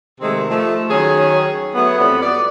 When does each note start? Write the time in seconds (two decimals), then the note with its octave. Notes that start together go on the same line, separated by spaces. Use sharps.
0.21 C3 D#3 G#3 A3 C4
0.50 F3 A3
0.89 D#3 F#3 C#4 G#4
1.74 F#3 A3 B3
1.98 F2 E3 G3 B3
2.22 D5